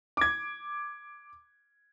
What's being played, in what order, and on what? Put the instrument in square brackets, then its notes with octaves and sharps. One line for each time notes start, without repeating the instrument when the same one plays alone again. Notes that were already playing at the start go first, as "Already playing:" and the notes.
[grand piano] D6 G#6